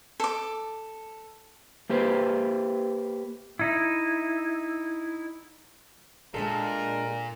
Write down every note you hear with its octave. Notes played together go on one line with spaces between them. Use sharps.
A4 D6
A#3 G4 B4 C5
D#4 E4
A#2 G#3 D4 A4 A#4